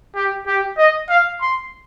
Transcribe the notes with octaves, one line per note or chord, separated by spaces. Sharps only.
G4
G4
D#5
F5
C6